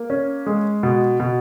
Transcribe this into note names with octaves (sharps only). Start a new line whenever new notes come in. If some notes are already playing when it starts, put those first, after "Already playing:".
Already playing: A#3
C#4
G#3
B2
B2